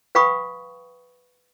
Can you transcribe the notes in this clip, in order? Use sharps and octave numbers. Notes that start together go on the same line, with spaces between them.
B4 F5 G5 B5 C#6 D#6